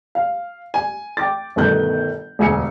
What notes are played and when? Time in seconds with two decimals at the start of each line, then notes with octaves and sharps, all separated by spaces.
0.15 F5
0.74 G#5
1.17 G5 D6 A6
1.56 G1 B2 D#3 A3 F#6 G6
2.39 E1 D2 G#5 C#7